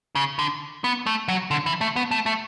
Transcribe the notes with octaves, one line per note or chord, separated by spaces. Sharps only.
C#3
D3
B3
A3
F#3
D3
E3
A3
B3
A3
A3